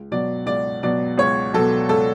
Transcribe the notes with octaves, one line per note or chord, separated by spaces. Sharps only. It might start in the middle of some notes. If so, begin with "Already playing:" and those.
Already playing: C#2
B2 F#3 D5
C#2 D5
B2 F#3 D5
C#2 C#5
B2 F#3 A4
C#2 A4